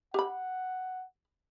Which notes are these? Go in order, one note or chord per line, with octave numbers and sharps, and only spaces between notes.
G4 F#5 B5